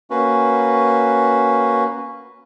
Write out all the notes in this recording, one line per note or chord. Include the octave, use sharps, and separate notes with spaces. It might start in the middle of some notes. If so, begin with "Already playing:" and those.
A#3 C#4 F#4 B4